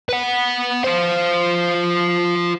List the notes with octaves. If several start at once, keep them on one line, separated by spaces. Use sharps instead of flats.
B4 F#5
F4 C5